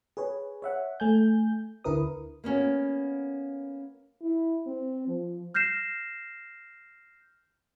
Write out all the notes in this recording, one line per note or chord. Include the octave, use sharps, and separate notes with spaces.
G#4 B4 C#5
C#5 E5 F#5
A3 G#5 G6
D2 D3 E4 A#4 B4 D#6
A#3 B3 C#4 F#4
E4
C4
F3
F6 G6 A#6 C7 E7